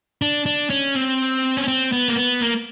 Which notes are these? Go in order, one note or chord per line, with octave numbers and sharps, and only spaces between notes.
D4
D4
C#4
C4
C#4
C4
B3
A#3
B3
A#3